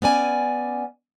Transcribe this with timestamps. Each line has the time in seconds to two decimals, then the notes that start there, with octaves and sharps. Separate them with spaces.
0.02 B3 C#4 D5 G#5